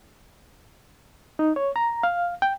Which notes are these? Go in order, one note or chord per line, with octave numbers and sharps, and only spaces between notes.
D#4
C#5
A#5
F5
G5